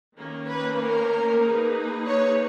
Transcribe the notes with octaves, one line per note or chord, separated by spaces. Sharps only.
D#3 A#3 C#4
B4
A#4
A#3 D#4 G#4 B4
C#5